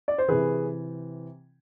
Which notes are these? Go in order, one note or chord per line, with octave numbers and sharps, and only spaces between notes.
D5
C5
C3 E3 G#4 B4